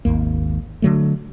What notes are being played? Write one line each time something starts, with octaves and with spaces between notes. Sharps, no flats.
G#1 D#2 A#3
D3 F#3 A3